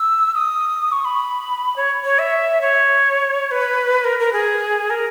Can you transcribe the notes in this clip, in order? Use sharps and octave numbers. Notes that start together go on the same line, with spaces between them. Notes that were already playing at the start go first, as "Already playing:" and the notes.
Already playing: E6
D#6
C#6
B5
C#5
C#5
E5
C#5
C#5
B4
A#4
A#4
G#4
A#4